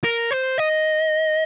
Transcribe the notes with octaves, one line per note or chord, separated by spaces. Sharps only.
A#4
C5
D#5